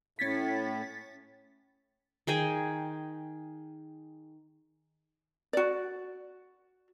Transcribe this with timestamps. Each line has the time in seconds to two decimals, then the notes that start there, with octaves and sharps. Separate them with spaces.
0.19 A2 C#4 A6 B6
2.27 D#3 G#4 G5 G#5
5.53 F#4 D5